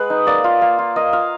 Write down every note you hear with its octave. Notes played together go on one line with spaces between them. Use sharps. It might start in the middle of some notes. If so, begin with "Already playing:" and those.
Already playing: G#3 B4 F#5
D#4
A#3 D5
F4
A#3
F4
A#3 D#5
F4 F5